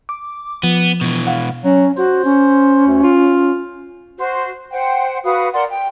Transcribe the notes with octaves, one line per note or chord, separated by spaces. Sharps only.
D6
F3 B3
B2 E3
F5 F#5
F#3 C#4
F#4 C5
C#4
D2
F4
F#4 C5
C5 F#5 G5
F#4 B4 F5 D#6
A#4 D5 F#5 C6
G5